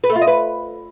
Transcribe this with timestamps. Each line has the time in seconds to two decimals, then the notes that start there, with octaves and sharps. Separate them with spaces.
0.04 B4
0.10 A3
0.16 F4
0.21 D#5
0.27 B4